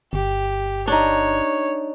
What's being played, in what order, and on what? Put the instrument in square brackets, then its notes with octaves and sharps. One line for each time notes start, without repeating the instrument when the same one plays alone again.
[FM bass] G1 [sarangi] G4
[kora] D4 D#4 [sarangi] C#5